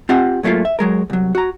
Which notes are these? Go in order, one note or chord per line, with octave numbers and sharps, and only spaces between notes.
C4 F4 G4 F#5
G#2 F#3 A3 A#3 F4
E5
F#3 G#3 A#4
C2 F#3
F#4 A#5